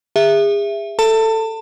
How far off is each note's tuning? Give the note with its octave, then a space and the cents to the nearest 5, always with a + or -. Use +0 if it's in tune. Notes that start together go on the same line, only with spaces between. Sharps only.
G#4 -35 E5 +10
A4 +10 A5 +35